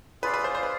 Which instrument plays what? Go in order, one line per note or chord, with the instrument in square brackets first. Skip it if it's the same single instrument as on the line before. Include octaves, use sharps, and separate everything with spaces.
[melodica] F4 G#4 D5 F5 [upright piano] B4
[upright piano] B4
C5
C5
B4